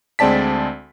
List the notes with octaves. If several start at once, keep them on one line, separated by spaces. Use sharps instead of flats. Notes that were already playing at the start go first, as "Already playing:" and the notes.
D2 G#3 C4 D5 A5 B6